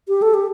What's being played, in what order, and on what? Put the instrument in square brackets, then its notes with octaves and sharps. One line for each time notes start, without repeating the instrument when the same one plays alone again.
[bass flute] G4
A4
G4